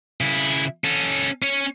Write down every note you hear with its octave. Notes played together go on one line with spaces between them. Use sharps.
C#3 E4
C#4 A4
C#4 C#5